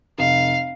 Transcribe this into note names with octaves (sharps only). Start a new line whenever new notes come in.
F1 F5